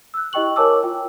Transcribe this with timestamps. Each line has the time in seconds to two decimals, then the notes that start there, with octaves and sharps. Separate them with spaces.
0.14 E6 F#6
0.33 E4 G4 D#5 G5 C#6 F#7
0.56 A#4 C#5 G#5 A5 D6 E6
0.83 F4 G5